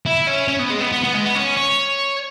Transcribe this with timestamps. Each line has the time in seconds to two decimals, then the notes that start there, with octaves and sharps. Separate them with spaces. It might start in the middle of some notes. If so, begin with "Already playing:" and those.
0.06 E4
0.27 C#4
0.48 C#4
0.59 B3
0.70 G#3
0.80 B3
0.92 B3
1.03 B3
1.14 G#3
1.25 B3
1.35 C#4
1.57 C#5